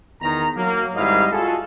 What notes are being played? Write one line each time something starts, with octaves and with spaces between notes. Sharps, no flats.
E2 D#3 A#5
F#3 A#3
G#1 G#2 G3 E4 D#5 F5
F4 F#4 G#4 A4